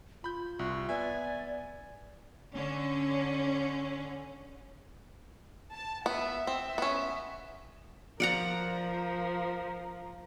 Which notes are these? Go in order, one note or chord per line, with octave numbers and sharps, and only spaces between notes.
F4 B5 G6
C2 F#4
B3 D5 E5 G#5
D3 C#4
A5
B3 E5
C4 E5
B3 C#4
F3 A#4 D5 F#5 A#5